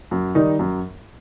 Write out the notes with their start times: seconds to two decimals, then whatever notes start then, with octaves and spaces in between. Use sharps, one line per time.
0.11 F#2
0.35 D#3 G3 D#4
0.59 F#2